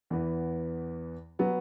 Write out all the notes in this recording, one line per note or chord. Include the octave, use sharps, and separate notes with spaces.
E2 E3 B3
F#3 B3